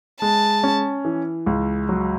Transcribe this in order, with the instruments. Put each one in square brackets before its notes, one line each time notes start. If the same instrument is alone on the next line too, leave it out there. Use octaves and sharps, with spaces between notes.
[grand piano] G#3 [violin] A5
[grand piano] C#4
E3
C#2
F#3